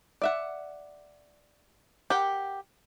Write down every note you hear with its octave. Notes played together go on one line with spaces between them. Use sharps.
D5 E5 F#5
G4 A#4 F#5 G5